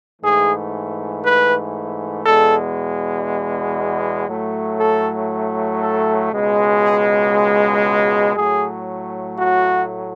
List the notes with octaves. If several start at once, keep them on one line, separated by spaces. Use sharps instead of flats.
G#2 E3 A3 G#4
B4
E2 B2 G#3 A4
A2 F#3 A3
A4
A4
C#2 B2 G#3
G#4
A2 F#3 A3 G#4
F#4